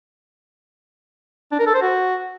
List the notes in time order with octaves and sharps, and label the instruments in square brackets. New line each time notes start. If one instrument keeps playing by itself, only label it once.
[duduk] D4
A#4
A4
C5
F#4